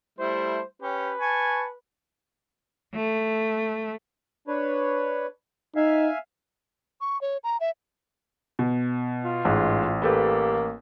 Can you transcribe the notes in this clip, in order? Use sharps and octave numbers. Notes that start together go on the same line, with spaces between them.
G3 A3 E4 C5
C#4 G4 B4
G#5 A5 C#6
A3
D4 B4 C#5
D#4 E5 F5 G#5
C#6
C#5
A#5
E5
B2
F4
A1 G#2
A#3 G4 A4 B4